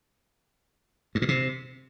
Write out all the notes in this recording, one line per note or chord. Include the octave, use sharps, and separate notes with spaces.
G2
A#2
C3